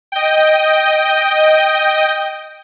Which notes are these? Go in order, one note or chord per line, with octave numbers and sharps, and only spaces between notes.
D#5 G5